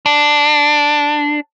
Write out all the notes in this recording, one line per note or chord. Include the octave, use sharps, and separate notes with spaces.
D4